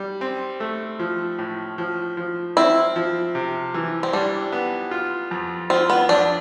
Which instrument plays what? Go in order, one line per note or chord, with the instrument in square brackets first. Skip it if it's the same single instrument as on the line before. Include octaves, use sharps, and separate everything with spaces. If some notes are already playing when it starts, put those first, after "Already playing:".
Already playing: [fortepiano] G3
C4
A3
F3
A2
F3
F3
[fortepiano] C4 [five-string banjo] E4
[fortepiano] F3
C3
E3
[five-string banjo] C4
[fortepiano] G3 [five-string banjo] D4
[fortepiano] B3
F4
F2
[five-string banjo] C4 [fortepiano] F4
[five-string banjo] B3
[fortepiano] F2 [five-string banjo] D4